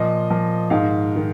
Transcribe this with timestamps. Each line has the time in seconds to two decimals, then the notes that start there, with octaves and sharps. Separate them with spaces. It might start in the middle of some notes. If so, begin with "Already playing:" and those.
Already playing: A#2 F3 D#5
0.30 A#2 F3
0.70 G#2 D#3 F5
1.16 D#3